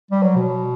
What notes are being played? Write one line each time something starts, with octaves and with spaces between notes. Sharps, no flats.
G3
F#3
B2